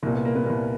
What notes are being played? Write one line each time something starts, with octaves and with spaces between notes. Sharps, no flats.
C2 A#2 A#3
B3
A#3
B3
C2 A#2 A#3